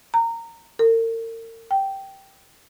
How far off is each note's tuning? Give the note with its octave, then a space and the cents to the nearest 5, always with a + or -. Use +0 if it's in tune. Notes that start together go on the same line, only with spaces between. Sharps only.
A#5 -20
A#4 -40
G5 -10